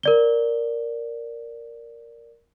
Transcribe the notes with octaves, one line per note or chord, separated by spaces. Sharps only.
A#4 D5 G7